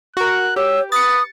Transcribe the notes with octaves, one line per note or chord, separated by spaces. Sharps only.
F#4 A#4 F#6
G4 C#5 E6
B4 D#6 A6 C#7